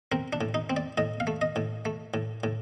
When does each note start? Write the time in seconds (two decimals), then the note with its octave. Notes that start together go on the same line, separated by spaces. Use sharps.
0.12 C4 A#4
0.33 D4
0.41 A2
0.54 D#4
0.70 C4
0.77 D5
0.98 A2 D#5
1.20 F5
1.27 A3
1.41 D#5
1.56 A2
1.85 A3
2.14 A2
2.44 A2